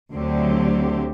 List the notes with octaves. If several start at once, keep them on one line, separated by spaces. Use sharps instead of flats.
D2 D3 F#3 C4 G4